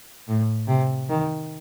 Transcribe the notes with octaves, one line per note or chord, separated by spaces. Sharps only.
A2
C3
D#3